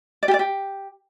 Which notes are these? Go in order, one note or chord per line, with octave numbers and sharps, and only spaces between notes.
D5
G4
D5
G4